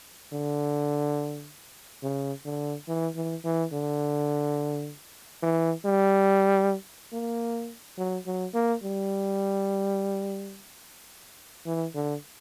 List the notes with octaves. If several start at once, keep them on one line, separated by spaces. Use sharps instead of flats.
D3
C#3
D3
E3
E3
E3
D3
E3
G3
A#3
F#3
F#3
A#3
G3
E3
D3